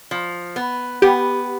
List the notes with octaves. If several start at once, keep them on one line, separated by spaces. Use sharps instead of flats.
F3
B3
B3 G4